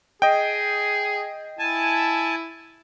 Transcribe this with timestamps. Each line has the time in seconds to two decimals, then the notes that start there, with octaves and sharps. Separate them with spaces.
0.22 G#4 D#5 G5
1.59 E4 G#5 A5